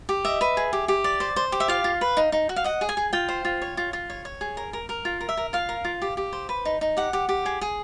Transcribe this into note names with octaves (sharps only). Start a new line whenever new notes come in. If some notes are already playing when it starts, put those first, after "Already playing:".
G4
D#5 E5
B4
G#4
G4
G4
D5
C5
C5
G4
E5
F4 F5
F4
B4
D#4
D#4
F#4
F5
D#5 F#5
G#4
G#5
G#4
F4 G5
C5
F4
C#5
F4
F4
C#5
C#5
G#4
A#4
A#4
A#4
F4
A#4
E5
A#4
F4 F5
A#4
F4
G4
G4
C5
B4
D#4
D#4
G4 F#5
G4
G4
G#4
G#4